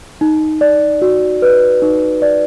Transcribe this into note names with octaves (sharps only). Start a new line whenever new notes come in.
D#4
D5
F#4
B4
D#4
D5